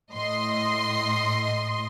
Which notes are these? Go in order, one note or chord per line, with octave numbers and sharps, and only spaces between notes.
A2 D#5 C6